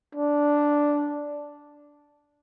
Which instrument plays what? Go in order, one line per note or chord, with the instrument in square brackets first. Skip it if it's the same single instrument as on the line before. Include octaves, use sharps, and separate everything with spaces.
[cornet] D4